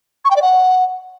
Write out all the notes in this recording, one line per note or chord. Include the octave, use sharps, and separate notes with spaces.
C#6
G5
D5
F#5